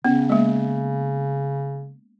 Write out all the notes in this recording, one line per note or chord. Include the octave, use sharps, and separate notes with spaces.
C#3 B3 C#4
G#3 A#3